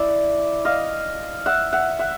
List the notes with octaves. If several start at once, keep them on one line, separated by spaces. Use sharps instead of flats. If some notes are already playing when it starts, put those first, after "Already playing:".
Already playing: E4 D5 E5
D#5 F5
E5 F#5
E5 F#5
E5 F#5